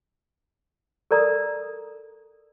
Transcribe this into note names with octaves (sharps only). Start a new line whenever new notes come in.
A4 A#4 D5 A#5 D#6